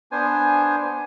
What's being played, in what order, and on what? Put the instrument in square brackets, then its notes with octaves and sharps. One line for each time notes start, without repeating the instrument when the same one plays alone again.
[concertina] B3 D4 C5 G#5